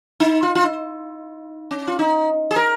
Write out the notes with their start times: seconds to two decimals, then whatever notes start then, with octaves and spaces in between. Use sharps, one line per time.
0.20 D#4
0.43 F4
0.55 F4
0.64 D#4
1.71 C#4
1.87 F4
1.99 D#4
2.51 G#4
2.56 A#4